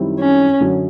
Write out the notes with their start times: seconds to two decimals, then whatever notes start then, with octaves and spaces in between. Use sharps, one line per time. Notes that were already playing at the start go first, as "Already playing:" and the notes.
Already playing: F#2 D#3 G3 C4 E4
0.20 C#4
0.60 F#2 D3 F#3